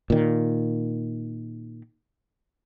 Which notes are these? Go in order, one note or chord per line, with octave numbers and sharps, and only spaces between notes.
A#2 D#3